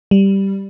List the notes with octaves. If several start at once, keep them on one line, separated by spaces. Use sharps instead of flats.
G3